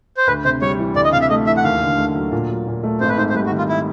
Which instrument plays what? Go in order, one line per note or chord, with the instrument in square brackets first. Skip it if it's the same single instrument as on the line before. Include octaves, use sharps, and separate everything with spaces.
[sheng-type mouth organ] C5
[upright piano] D2 [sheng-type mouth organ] B4
[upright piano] C3 [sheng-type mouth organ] C5
[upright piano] G3 [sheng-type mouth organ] C#5
[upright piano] E3
[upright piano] D2 [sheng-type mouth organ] D5
[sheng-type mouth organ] D#5
[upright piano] C3 [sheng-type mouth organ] F5
[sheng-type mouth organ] E5
[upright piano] A3 [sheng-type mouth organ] D#5
[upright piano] E3 [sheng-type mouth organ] E5
[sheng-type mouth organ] F#5
[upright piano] D#2 [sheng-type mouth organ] F5
[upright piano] D3
A3
F#3
A#2
F#3
A#2
A3
[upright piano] G#1 [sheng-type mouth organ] C5
[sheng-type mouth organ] B4
[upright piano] G#2 [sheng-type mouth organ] C5
[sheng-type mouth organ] C5
[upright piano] G3 [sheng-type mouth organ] B4
[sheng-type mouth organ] F#4
[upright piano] D#3
[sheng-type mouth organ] F4
E4